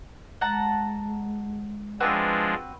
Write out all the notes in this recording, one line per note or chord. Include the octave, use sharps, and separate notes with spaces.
G#3 F#5 A5 A#5
F3 G#3 C4 D4 F#4 B4